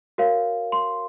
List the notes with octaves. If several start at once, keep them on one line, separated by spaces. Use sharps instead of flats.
F#4 A#4 C#5 F5
C6